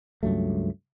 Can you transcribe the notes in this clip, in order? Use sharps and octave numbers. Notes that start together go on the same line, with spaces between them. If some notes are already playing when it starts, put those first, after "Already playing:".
C#2 G2 F#3 A3